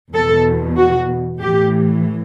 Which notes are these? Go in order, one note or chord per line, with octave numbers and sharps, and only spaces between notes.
E2 B2 A4
F#4
A2 E3 G4